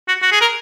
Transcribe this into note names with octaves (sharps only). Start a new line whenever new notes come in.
F#4
F#4
G#4
A#4